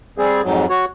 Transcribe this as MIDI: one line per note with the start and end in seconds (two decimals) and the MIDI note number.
0.18 0.41 55
0.18 0.41 60
0.18 0.41 68
0.44 0.66 41
0.44 0.66 44
0.44 0.66 54
0.70 0.85 66
0.70 0.85 73